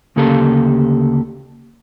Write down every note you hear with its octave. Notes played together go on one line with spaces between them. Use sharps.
D2 C#3 A#3 G4 A4 F5